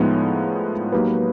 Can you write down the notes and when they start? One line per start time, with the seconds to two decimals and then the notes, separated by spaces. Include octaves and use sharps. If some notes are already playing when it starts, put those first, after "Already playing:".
Already playing: A2 F3 G#3 B3 D#4
0.92 F#3 A#3 D#4 G4 B4